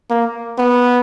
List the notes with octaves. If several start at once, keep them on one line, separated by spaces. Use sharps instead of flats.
A#3
B3